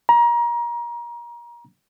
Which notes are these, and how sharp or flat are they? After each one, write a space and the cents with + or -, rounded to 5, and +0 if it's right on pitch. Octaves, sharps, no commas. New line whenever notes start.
A#5 +30